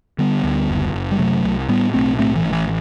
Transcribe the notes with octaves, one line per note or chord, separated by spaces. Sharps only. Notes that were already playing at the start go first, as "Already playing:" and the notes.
D3 G3 B3
D2
F#1
F#1
G3
C3 F#3 A3
C2
A2 G3 B3
B1 A3 C4
A2 A3 C4
E3
A1
E3